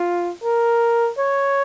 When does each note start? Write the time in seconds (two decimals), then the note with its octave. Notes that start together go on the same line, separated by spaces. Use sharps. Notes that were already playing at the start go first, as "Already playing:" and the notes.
Already playing: F4
0.43 A#4
1.18 C#5